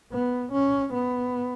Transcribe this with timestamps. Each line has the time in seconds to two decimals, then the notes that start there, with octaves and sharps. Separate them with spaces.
0.12 B3
0.52 C#4
0.94 B3